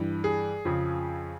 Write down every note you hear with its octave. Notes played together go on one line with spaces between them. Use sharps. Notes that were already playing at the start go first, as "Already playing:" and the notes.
Already playing: G2 E3
G#4
F2 C#3 F3